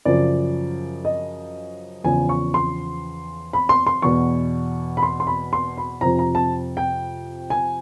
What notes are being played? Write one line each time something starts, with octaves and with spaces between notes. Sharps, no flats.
F#2 C#3 F3 D5
D#5
E2 C#3 F3 G#5
C#6
C6
B5
C6
C6
E2 B2 C#6
B5
C6
C6
B5
C6
B5
F2 C3 F3 A#5
A#5
A5
G5
G#5